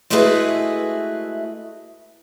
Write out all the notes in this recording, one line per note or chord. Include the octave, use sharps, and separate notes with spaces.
G#3 A3 E4 F#4 G#4 B4